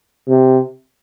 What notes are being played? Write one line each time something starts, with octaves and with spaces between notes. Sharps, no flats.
C3